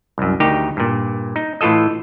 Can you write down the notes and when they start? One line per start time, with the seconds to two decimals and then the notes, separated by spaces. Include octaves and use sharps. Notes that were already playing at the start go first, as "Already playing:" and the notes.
0.18 C2 F#2
0.40 D2 D#3 D#4 G4
0.77 G2 A#2
1.36 D#4
1.61 A2 E3 F4 A4 D#5